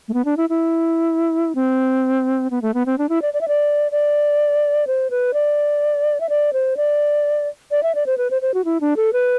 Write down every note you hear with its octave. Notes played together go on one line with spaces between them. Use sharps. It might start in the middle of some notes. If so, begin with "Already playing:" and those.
A3
B3
D4
E4
E4
C4
B3
A3
B3
C4
D4
E4
D5
D5
E5
D5
D5
C5
B4
D5
E5
D5
C5
D5
D5
E5
D5
C5
B4
C5
C5
F#4
E4
D4
A4
B4